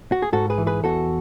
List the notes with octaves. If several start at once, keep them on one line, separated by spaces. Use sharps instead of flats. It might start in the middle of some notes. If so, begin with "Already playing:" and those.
F#4
G#4
G#2 F#4 A4
G#4 B4
E3
G#4 B4
E2 F#4 A4